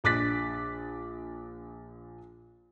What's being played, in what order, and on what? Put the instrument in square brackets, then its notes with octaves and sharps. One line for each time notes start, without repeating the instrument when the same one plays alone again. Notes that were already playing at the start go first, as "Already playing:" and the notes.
[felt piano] A#1 D4 D6 F#6 A6 B6